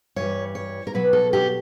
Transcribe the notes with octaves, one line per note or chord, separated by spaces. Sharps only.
G2 E3 G3 C#5
C#5
A#4
B2 F#3 B4
A4
G4